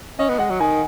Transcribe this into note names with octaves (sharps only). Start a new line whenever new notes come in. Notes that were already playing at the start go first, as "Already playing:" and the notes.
C#4 D#5
B3
G#3 F#5
F#3
D#3 G#5